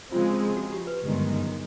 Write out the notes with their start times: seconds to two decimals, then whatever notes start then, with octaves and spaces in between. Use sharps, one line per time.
0.12 C#3 F3 G#3 C4 F4
0.57 F#4
0.72 G4
0.87 B4
1.02 G1 F#2 D#3 G#3